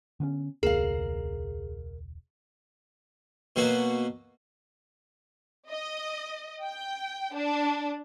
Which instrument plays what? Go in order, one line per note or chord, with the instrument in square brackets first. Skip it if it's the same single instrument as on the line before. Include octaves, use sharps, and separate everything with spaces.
[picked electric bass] D3 B3 C#4
[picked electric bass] E1 C#2 A#3 [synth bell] G#4 [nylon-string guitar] A#4 F5
[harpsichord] B2 F#3 A#3 F#4
[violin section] D#5
G5
D4